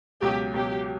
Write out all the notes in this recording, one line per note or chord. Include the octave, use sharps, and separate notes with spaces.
C#2 B2 F#3 G4
C#2 B2 F#3 G4